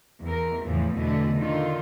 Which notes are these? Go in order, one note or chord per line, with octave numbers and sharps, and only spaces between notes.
E2 A#4
E2 A2 C#3 E3 F3
E2 B2 D3 F#3 A3 D#5
D3 D#3 D#4 F4